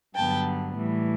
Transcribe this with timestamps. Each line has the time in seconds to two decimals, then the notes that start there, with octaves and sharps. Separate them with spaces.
0.15 G2 D3 F#3 B3 G5 A5
0.76 A2 E3 G3